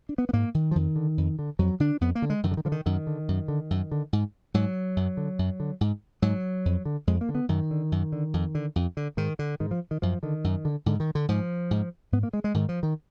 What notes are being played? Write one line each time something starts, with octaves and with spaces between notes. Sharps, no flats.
D4
B3
B3
G#2 A#3
D#3
F3
F2 D#3
D3
F2
D3
F2 F#3
D3 D4
F2 B3
A#3
D3
G#3
F#2 D#3
D3
D#3
D3 F3
D#3
F#2 D#3
D3
F#2
D3
F#2
D3
G#2
G#2 F#3
F#2
D3
F#2
D3
G#2
G#2 F#3
F2
D3
F2 G#3
A#3
D3
B3
F#2 D#3
D3
F#2
D3
F2
D3
F2
D3
G#2 D#3
D3
G#2 D#3
F3
D#3
F#2 F3
D3 D#3
F#2
D3
G#2 D3
D#3
D3
G#2 F3
G#2
G#2 B3
A#3
G#3
G#3
G#2 D#3
F3
D#3